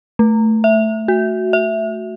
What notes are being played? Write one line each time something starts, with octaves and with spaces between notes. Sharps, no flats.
A3
E5
F#4
E5